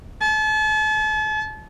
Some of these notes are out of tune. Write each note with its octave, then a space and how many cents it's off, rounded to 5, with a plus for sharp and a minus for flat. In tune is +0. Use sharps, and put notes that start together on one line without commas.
A5 -40